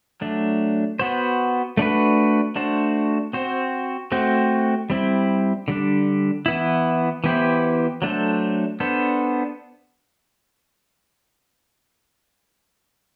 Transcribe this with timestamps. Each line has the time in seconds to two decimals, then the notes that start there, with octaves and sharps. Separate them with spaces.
0.21 F#3 A3 D4
0.99 B3 F#4 C5
1.77 A3 D4 F#4 B4
2.56 A3 D4 F#4 C5
3.33 C4 F#4 C5
4.12 A3 C4 F#4 C5
4.90 G3 C4 E4
5.68 D3 G3 D4
6.46 E3 B3 E4
7.24 E3 B3 E4 G4 C5
8.02 F#3 A3 D4 A4 C5
8.80 B3 D4 A4 C5